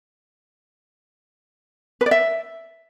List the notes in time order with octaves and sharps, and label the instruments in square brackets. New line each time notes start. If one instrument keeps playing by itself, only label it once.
[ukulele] B4
D5
E5